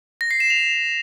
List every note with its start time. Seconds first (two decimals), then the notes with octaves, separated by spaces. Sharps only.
0.21 A#6
0.31 C7
0.40 E7
0.50 F7